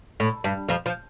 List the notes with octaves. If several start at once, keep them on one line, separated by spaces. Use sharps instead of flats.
A2
G2
F2 F3
F3